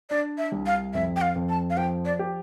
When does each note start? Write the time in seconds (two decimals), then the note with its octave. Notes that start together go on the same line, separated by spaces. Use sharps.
0.10 D4 D5
0.38 E5
0.52 C2
0.66 F5
0.94 F2 E5
1.16 G5
1.22 F5
1.36 F2
1.49 A5
1.70 F5
1.77 F3 G5
2.05 D5
2.19 G4